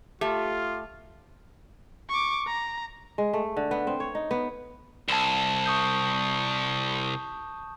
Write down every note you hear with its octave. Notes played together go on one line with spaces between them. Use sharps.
A3 F4 G4
C#6 D6
A#5
G#3
A3
D3
B3
C4
C#5
D#4
B3
C2 A5 E7
C#6 D#6 G6